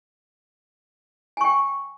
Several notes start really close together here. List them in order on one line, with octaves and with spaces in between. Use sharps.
G#5 C#6 G5